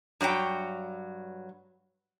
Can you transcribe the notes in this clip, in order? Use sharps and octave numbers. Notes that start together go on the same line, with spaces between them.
G2 F#3 C#5 G5